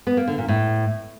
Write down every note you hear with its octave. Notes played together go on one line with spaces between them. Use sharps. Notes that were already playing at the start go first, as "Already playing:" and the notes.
B3
A#3
D3
A#2
A2